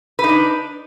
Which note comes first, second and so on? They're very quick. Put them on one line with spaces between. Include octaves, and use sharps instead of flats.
B4 D#4 D4